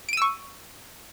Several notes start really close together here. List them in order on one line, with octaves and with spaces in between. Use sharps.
D7 D#7 E6 C#6